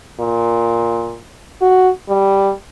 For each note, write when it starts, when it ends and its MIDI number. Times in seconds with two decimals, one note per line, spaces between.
0.20 1.19 46
1.62 1.90 66
2.09 2.52 55